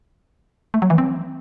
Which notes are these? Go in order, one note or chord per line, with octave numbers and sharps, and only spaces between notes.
A3
F#3
E3
C4